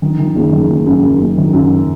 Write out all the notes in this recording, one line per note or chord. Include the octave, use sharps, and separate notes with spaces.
D#3
D#3
F#1
D#3
F#1
F#2
F#2
F#1
D#3
F#2